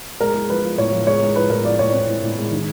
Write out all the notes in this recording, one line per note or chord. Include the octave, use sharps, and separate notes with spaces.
G#3 A#4
G#3
F3 B4
F3
A2 C#5
F3
G#3 C#5
G#3
F3 B4
A2 A#4
F3 D5
A2 C#5
C4
A2
A2
G#3
D#3